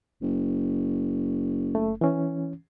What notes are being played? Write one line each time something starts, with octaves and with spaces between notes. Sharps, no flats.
F#1
A3
E3 C#4